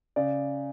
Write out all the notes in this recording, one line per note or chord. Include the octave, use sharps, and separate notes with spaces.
C#3 D5